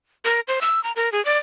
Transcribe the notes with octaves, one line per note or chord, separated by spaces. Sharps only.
A#4
C5
E6
A#5
A#4
G#4
D5